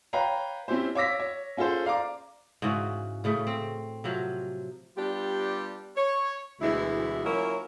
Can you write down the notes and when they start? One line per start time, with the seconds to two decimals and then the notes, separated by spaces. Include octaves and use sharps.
0.13 B4 C#5 F5 G5 A#5
0.68 C4 C#4 E4 G4 C5
0.95 C#5 F5 D6 E6 A#6 B6
1.20 C#5
1.57 C#4 F4 G#4 A4 C5
1.85 D5 F5 A#5 D6
2.62 G#2 C#3 E3 F#4
3.24 A2 C#3 A3
3.47 C4
4.04 C3 F3 F#3
4.97 G3 B3 D4 F4 G4
5.96 C#5
6.61 D2 B2 E3 G#3 E4
7.24 F#3 A#3 C#4 E4 F4 A#4